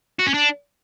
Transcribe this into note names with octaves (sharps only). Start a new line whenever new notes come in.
F#4
C#4
D4